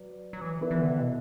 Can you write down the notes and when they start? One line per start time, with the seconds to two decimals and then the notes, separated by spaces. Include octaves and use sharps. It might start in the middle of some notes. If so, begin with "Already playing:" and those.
Already playing: F#3 B4 D5
0.33 F#3
0.42 E3
0.60 B3 E4 B4 D5
0.71 E3
0.80 D3
0.90 C3
0.99 B2